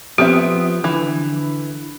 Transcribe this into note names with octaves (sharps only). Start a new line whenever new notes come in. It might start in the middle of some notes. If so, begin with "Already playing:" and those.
F3 B3 C4 G4 E5
D3 E3